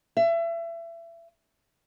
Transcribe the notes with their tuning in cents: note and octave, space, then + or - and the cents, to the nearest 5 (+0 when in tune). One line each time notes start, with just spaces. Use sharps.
E5 +30